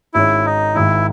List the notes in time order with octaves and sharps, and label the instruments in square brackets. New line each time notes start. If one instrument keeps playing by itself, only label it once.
[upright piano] G#1 G#2 D#3 G#3 C#4 [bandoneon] E4
[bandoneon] D#4
[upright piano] G#1 G#2 D#3 [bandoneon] E4